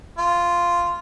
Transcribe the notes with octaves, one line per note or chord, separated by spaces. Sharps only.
F4